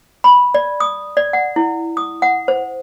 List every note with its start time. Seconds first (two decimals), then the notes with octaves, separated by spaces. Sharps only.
0.24 B5
0.54 D5
0.80 D#6
1.17 D5
1.33 F#5
1.56 E4
1.97 D#6
2.22 F#5
2.48 C5